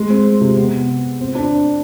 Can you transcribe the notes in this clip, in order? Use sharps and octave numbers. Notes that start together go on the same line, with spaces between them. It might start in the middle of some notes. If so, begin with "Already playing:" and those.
Already playing: G#3
C4
C3
B3
C4
D4